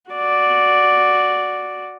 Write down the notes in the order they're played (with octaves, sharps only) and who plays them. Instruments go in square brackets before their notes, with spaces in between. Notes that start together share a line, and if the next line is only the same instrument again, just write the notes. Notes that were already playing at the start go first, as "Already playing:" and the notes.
[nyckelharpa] F#4 D5